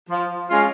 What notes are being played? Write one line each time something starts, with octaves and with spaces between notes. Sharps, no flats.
F3
G#3 C#4 F4